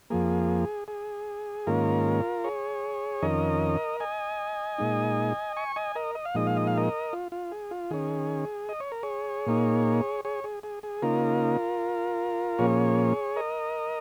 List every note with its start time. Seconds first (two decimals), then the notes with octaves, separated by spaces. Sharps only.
0.10 F2 F3 A#3 G#4
0.88 G#4
1.67 G#2 D#3 A#3 C#4 F4 A#4
2.44 G#4 C#5
3.22 F2 D#3 C#4 A#4 D#5
4.00 D#5 G#5
4.78 A#2 G#3 D#4
5.56 G#5 C#6
5.76 D#5 G#5
5.95 A#4 D#5
6.15 D#5
6.25 F5
6.35 A#2 F3 G#3 D#4 D#5
6.47 F5
6.57 D#5
6.67 F5
6.78 A#4 D#5
7.13 F4
7.32 F4
7.52 G#4
7.71 F4
7.91 D#3 C#4 G#4
8.69 D#5
8.80 C#5
8.92 A#4
9.03 G#4 C#5
9.46 A#2 A#3 D#4
10.25 G#4 C#5
10.44 G#4
10.63 G#4
10.83 G#4
11.02 C#3 A#3 D#4 F4 A#4
12.59 A#2 F3 A#3 C#4 G#4 C#5
13.36 A#4 D#5